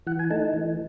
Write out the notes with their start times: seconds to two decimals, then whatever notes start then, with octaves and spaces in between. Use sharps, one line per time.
0.07 E3 F#5
0.19 G#5
0.30 A3 D#4 A5
0.53 E3